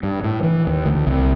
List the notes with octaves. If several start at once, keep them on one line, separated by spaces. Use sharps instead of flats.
G2
A2
E3
D#2
D2
C2